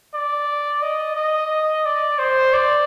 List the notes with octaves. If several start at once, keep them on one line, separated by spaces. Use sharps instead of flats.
D5
D#5
D#5
D5
C5
D5